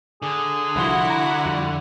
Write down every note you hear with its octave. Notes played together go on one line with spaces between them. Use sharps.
D3 G#4
C2 F3 E4 F#4 F#5 C6
A#5
F2 G3